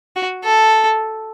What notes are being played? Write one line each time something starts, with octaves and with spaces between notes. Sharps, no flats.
F#4
A4